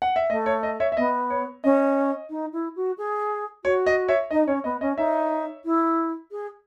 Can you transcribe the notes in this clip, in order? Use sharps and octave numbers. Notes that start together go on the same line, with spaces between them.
F#5
E5
A3 D#5
C#5
D#5
C#5 E5
E5
B3 D#5
C#5
C#4 D#5
D#4
E4
F#4
G#4
F#4 C#5
D#5
C#5 E5
D#4 D#5
C#4 C#5
B3 D#5
C#4 D#5
D#4 C#5 E5
E4
G#4